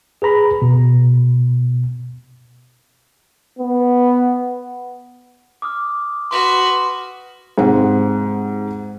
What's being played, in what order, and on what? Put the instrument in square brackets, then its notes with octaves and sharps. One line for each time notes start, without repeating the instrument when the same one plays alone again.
[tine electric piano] G#4 B4 A#5 B5
B2
[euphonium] B3
[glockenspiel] D6 D#6 F6
[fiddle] F#4 B4 [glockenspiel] C6
[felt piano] G#2 C3 C4 F#5